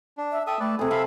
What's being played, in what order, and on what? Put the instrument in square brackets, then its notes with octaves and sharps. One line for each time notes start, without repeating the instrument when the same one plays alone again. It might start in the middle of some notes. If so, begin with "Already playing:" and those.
[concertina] D4
[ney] E5
[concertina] A4 E5 D#6 [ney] G5
[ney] A3 [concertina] A4 B4 D5
[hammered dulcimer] C3 G#5 [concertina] G#4 [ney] A4
[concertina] E5 F5 B5 [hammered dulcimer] A5